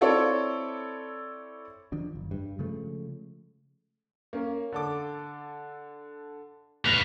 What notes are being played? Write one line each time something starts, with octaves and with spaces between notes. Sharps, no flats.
C4 E4 A4 C#5 D5
D#3 F3 D4
F#1
G2
C#3 F3 G#3 A3
A#3 C#4
D3 A4 D6
F1 B4 F5 A#6 B6